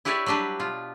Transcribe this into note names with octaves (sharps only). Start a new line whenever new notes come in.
E4 G4 B4 C#5 D5 E5
F#3 G3 D4 G4 B4
B2 F4